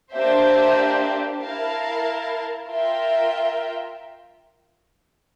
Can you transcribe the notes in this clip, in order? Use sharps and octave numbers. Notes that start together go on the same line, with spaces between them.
A#3 D4 G4 C5 E5
E4 A#4 F5 A5
F4 A#4 E5 G5